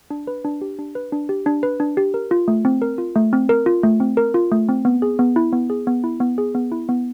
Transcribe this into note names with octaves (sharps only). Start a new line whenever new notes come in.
D4
B4
D4
G4
D4
B4
D4
G4
D4
B4
D4
G4
A#4
F4
A3
C4
A#4
F4
A3
C4
A#4
F4
A3
C4
A#4
F4
A3
C4
B3
G#4
B3
E4
B3
G#4
B3
E4
B3
G#4
B3
E4
B3